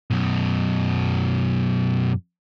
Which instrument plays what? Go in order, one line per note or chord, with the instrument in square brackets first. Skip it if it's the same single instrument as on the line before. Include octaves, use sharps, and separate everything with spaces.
[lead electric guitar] F#2 B2